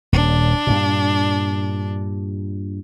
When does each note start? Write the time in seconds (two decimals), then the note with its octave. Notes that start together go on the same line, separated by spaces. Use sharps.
0.13 D#1 D4
0.67 G2 A#2